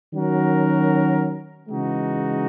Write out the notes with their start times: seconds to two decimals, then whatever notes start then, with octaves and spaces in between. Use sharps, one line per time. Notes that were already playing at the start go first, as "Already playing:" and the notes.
0.12 D#3 F#3 C#4 F#4 A#4
1.69 C#3 E3 G#3 D#4 F#4